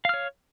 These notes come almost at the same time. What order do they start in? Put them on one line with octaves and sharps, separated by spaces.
F5 F6 C#5